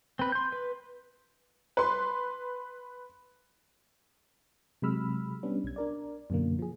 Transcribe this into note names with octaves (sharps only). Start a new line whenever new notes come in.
C4 B4
C6 G6
B4
B4 C6
C3 F#3 G#3 B5 E6 F6
G3 B3 C#4 D4
B1 G#6
D4 A#4 D5
F#2 B2 D3 A#3
F3 G#4